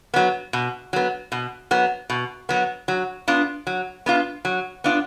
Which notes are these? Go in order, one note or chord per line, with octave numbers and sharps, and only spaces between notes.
F#3 B3
B2
F#3 B3
B2
F#3 B3
B2
F#3 B3
F#3
B3 D4 F4
F#3
B3 D4 F4
F#3
B3 D4 F4